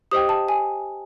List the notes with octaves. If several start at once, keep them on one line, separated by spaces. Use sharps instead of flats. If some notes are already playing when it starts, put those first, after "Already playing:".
G4 C5 D#5 G5 D#6
A5
G#5